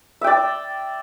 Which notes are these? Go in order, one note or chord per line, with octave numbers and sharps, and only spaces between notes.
D5 E5 G5